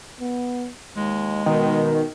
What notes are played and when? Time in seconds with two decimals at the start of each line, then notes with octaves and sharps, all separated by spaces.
0.20 B3
0.96 D#2 G#3
1.46 B2 D#3